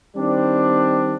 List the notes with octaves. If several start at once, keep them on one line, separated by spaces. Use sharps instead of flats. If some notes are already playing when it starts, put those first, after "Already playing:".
D#3 G3 C4 D4